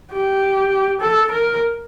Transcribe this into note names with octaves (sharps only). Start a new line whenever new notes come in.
G4
A4
A#4